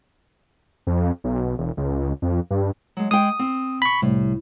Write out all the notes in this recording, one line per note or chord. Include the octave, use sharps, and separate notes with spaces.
F2
B1
E1
C#2
F2
G2
F#3 G#3
G#3 G5 D#6
C4
B5 C#6
C2 A2